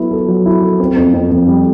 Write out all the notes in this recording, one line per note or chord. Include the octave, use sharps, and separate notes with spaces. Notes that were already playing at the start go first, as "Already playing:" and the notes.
Already playing: F#3 B3 E4 A4
A4
F#3
E4
A4
C4
F2
F2
F2
G3